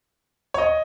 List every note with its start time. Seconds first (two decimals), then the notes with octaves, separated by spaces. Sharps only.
0.54 C#5
0.58 D#5